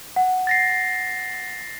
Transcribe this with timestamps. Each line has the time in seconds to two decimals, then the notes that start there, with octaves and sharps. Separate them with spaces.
0.16 F#5
0.47 A6 A#6 C7